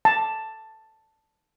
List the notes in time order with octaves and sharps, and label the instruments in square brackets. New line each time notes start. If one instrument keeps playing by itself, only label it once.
[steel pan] A5